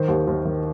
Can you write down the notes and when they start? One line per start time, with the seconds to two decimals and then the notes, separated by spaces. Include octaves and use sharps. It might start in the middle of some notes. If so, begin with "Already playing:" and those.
Already playing: D#3 C5
0.08 D#2
0.27 D#2 A#4
0.45 D#3